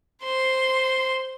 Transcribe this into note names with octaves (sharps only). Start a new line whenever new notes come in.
C5 C6